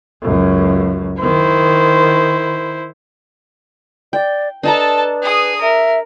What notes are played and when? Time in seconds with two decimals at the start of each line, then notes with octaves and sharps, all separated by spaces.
0.22 C#2 F#2
1.22 D#3 E4 C5
4.13 D5 G5
4.63 D4 A4 B4 D#5 A5 A#5
5.23 G#4 D#6
5.61 A#4 E5